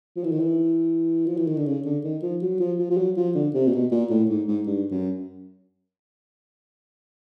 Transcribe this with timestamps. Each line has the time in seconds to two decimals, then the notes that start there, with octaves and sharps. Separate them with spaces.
0.16 F3
0.24 E3
0.31 D#3
0.40 E3
1.26 F3
1.37 E3
1.47 D#3
1.57 D3
1.66 C#3
1.85 D3
2.04 D#3
2.22 F3
2.42 F#3
2.60 F3
2.79 F3
2.90 F3
2.97 F#3
3.17 F3
3.35 D3
3.54 C3
3.67 A#2
3.73 B2
3.91 A#2
4.10 A2
4.29 G#2
4.48 G#2
4.67 G2
4.91 F#2